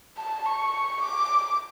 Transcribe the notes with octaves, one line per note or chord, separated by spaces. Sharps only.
A5
C#6
D6